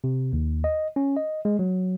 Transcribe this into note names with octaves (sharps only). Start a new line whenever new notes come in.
C3
D#2
D#5
C#4
D#5
G#3
F#3